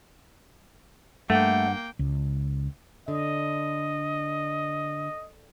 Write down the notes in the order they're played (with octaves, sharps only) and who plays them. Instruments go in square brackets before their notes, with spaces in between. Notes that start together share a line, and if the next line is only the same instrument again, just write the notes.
[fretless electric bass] G2 [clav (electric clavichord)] A3 [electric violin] A#3 G5 [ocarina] F#5
[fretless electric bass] C#2
[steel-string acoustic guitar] D3 [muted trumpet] D#5